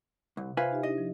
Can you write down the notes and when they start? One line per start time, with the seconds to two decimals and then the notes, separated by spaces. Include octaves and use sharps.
0.37 C2 C3
0.57 F4 B4 C5 E5 G#5
0.71 D#4 G4 E5
0.83 D4 E4 G4 D#5
0.98 F3